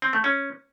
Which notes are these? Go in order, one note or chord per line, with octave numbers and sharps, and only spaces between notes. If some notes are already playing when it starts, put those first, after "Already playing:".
C4
A3
C#4